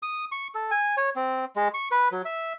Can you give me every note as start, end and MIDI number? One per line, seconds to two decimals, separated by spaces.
0.03 0.25 87
0.32 0.48 85
0.55 0.71 69
0.71 0.95 80
0.97 1.10 73
1.16 1.45 60
1.56 1.68 56
1.74 1.89 85
1.91 2.09 71
2.12 2.22 54
2.25 2.53 76